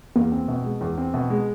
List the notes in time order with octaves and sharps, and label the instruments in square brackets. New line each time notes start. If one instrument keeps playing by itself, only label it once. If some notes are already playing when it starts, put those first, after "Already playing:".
[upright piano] E2 [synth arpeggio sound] A#3
[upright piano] C4
B2
G#3
E2
C4
B2
G#3